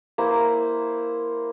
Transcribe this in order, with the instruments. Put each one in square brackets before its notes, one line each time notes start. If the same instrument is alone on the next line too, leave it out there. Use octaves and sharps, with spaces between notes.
[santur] A#3 E4 C5